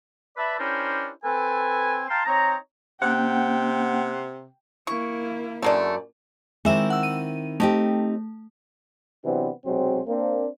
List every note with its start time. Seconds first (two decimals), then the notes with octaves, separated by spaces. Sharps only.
0.37 B4 D5 E5 A5 B5
0.60 C#4 D4 E4 G4 A#4 C5
1.24 C4 A4 B4 G#5
2.09 F5 G5 A5 A#5 C6
2.26 C4 D#4 C#5 A#5
3.02 C3 A#3 C#4 F#5 G5
4.87 A#3 E4 C#6
5.62 F#2 D3 G#3 A3 D5
6.65 D#3 G#3 C4 E4 E5 E7
6.90 F#5 E6
7.03 D#7
7.60 A3 C4 D#4 G4
9.25 C3 E3 F#3 B3 C4 D4
9.65 B1 C3 F#3 G#3 C4
10.07 A#3 C4 D4